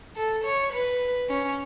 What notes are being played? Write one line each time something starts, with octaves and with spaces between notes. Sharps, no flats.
A4
C#5
B4
C#4